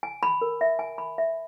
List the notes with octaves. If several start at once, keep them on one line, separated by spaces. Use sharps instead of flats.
G#5
B5
A#4
E5
G#5
B5
E5